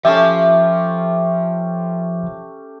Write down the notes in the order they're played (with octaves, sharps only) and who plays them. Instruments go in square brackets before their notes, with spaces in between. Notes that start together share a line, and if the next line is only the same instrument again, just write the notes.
[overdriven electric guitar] F3 A5 [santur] A3 C#4 G4 [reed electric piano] E5